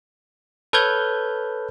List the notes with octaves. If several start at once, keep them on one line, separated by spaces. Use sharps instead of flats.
A4 B4 C#5 F6 G6 G#6